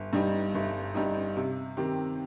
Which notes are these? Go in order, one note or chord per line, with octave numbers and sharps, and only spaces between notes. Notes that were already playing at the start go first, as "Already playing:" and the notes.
Already playing: G1
G2 G3 D#4
G1
G2 G3 D#4
C3
D#3 C4 G4